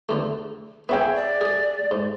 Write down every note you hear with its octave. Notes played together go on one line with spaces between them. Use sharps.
E2 D3 A3
B3 C#4 E4 G#4 E5 G5
D5
G#4 D#5
G#2